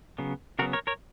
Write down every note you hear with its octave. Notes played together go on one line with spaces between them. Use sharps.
C#3 F#3 B3
C#3 F#3 B3 F#4 A#4
A#4 C#5
A#4 C#5